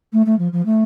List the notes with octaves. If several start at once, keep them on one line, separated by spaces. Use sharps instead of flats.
A3
A3
F3
F3
A3